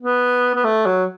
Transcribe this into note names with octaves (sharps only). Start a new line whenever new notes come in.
B3
B3
A3
F#3